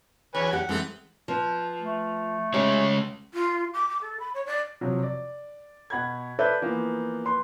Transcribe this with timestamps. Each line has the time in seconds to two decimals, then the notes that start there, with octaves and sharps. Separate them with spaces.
0.35 E2 B4 C#5 G#5
0.53 G4 F#5
0.69 E3 G#3 C4 A4
1.28 F3 B3
1.81 A3
2.54 G#3 C#4 G4 C#5
3.34 F4
3.74 D6
3.89 D6
4.01 A4
4.20 B5
4.34 C#5
4.46 D5
4.81 C3 F3 F#3
5.03 D5
5.90 B2 F#5 B5 G#6
6.39 A4 B4 C5 D5 E5 G6
6.62 E3 F3 A#3 B3
7.25 B4 C6